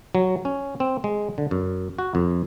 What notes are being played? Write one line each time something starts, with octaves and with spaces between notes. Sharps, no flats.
F#3
C#4
C4
G#3
D3
F#2
F#4
F2